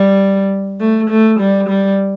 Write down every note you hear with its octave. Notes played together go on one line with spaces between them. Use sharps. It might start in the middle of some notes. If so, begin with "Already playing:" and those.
Already playing: G3
A3
A3
G3
G3